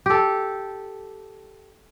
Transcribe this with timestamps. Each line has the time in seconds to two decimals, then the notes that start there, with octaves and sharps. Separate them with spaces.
0.06 G4 A4